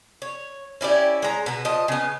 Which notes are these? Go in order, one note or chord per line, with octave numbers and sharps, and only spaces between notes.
C#5
C#4 E4 G4 D5
G#3 A#5
B2 B3
F3 D#5
C#3 B3